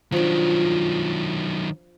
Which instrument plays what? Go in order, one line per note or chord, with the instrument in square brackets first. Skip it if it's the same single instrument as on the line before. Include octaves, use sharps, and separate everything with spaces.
[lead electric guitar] D#3 F#3 [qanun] F3 D4